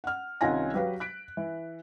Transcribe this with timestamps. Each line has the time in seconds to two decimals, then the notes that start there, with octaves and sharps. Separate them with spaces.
0.04 F#5 F6
0.41 C2 D#3 C#4 F4 G#5 A#6
0.74 F#3 G4 B4 F5
1.00 F#6 B6 D7
1.37 E3